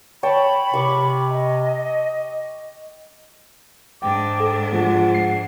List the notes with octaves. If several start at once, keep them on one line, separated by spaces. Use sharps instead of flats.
C#5 G5 A5 B5
C3 C#6 D6
D#5
G#2 D4 G5 D6
A4
F3 G#3 F#5
C7